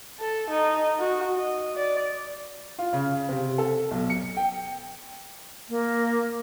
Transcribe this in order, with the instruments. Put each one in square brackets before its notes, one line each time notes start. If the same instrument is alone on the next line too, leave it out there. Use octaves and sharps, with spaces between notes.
[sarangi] A4
D#4
F#4
D#5
D5
[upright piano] F4
C#3
C3
A4
B1
C#7
G5
[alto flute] A#3